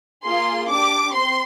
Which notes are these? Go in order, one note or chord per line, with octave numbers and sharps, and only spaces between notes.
A#3 F4 G#4 C6
D4 G4 D6
C4 C6